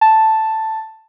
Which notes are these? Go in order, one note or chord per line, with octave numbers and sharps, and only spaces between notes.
A5